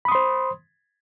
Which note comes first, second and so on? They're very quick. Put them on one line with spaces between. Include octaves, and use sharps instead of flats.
B5 D#6 C6 C5